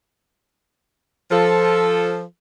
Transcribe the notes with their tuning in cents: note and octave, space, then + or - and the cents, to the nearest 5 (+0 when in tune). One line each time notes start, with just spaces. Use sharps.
F3 +0 A4 +0